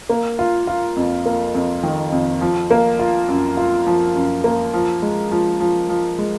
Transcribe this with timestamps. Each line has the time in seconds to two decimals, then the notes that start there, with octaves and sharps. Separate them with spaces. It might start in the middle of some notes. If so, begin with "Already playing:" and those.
0.09 A#3
0.39 F4
0.67 F4
0.96 F2
1.26 A#3
1.55 F2
1.83 D#3
2.12 F2
2.41 F3
2.71 A#3
2.99 F4
3.29 F#2
3.57 F4
3.87 F3
4.15 F#2
4.44 A#3
4.74 F3
5.02 G#3
5.31 F3
5.60 F3
5.89 F3
6.18 G#3